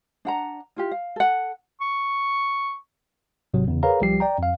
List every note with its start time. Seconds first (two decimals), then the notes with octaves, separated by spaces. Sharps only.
0.25 D4 F#5 A#5
0.76 E4 F4 G4
0.91 F5
1.16 A4 F#5
1.81 C#6
3.54 A1 G#2 C3 F#3
3.68 E2 C#3
3.83 G#4 A#4 B4 C#5 F5 A#5
4.01 C2 F3 G3 G4 C7
4.20 D5 G5 A#5
4.38 F2 F5